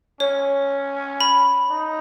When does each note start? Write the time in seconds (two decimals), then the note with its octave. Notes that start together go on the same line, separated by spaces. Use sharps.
0.20 C#4 C#5
1.20 B5
1.70 D#4